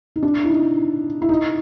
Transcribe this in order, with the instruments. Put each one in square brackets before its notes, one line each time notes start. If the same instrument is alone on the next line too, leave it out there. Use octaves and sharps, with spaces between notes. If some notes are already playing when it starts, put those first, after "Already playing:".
[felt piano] D#4
D4
E4
D#4
E4
D#4